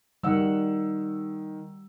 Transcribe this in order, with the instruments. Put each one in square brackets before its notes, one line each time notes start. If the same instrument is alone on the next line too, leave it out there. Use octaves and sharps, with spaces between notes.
[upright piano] D#3 E6 [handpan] G3 F#5